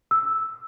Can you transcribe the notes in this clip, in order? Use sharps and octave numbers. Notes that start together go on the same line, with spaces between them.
E6